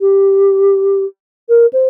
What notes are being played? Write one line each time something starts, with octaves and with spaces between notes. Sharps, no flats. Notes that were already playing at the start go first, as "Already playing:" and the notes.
G4
A#4
C5